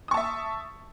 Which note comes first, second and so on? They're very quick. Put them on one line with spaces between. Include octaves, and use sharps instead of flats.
D#6 C#6 A5 E5